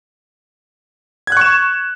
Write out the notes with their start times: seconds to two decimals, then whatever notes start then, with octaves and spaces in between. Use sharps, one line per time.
1.27 G#6
1.32 F#6
1.37 C#6
1.41 E7